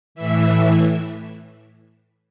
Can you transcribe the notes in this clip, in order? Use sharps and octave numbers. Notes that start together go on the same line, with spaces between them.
A2 E3 E5